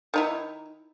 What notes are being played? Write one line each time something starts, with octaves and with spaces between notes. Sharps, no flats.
D#3 D#4 E4